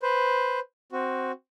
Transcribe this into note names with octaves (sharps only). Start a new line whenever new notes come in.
B4 C5
C4 F#4